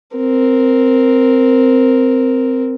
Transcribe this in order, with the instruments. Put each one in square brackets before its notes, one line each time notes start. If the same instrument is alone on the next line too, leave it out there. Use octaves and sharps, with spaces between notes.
[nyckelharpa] C4 A#4